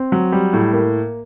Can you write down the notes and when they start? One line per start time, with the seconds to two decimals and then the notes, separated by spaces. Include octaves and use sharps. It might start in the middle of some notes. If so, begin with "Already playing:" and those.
Already playing: C4
0.12 F#3
0.32 G3
0.53 A2
0.73 A#3